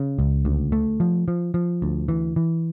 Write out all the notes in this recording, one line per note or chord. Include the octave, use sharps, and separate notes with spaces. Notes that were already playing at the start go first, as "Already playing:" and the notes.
Already playing: C#3
C#2
D2
A3
F3
F3
F3
D2
E3
E3